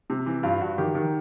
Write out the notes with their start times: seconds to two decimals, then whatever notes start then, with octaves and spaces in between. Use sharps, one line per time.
0.10 C3
0.26 E3
0.43 G2 F4
0.61 G2 F#4
0.78 D#3 G4
0.95 D#3